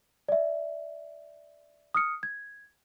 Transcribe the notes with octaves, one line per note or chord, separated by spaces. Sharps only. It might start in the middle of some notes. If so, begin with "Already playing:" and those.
D5 E5
D#6 F6 C#7
G#6